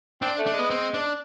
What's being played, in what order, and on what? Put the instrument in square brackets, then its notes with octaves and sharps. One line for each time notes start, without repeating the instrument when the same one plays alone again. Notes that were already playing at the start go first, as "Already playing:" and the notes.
[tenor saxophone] C4 [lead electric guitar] D4
[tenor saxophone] A3
[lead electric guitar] D4
[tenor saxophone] G#3
[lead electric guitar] B3
C4
D4